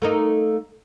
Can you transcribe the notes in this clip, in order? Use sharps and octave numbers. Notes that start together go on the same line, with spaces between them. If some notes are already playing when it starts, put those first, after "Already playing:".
A3 A#3 D#4